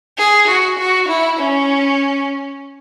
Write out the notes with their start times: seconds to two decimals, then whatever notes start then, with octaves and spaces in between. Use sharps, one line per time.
0.18 G#4
0.47 F#4
0.78 F#4
1.08 E4
1.39 C#4